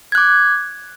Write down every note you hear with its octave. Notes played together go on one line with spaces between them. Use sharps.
D6 F#6 G#6